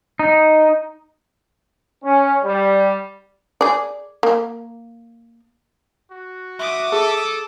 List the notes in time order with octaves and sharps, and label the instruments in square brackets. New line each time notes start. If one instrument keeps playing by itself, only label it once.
[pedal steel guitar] D#4
[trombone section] C#4
G3
[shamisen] G#4 D5
A#3
[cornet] F#4
[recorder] E5 [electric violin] D6 D#6
[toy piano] G#4 [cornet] A4